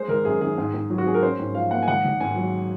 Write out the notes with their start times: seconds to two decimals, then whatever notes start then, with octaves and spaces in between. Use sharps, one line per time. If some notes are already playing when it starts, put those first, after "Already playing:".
Already playing: G#3 C5
0.08 G#1 A#4
0.25 F#2 G#4
0.41 D#3 G#4
0.58 G#2
0.74 G#2
0.90 F#3
0.98 F#4
1.06 C4 G#4
1.14 A#4
1.23 C#4 C5
1.39 G#2
1.55 F3 F5
1.71 A#3 F#5
1.83 G#5
1.88 G#1 F#5
2.05 G#1
2.20 G#2 G#5
2.36 F#3